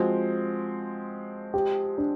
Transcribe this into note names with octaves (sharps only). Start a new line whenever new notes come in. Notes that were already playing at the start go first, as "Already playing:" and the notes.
Already playing: F3 G#3 C4 F#4
G4
D4